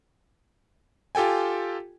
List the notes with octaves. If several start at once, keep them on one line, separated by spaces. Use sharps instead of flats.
F4 G4 A4 G5 G#5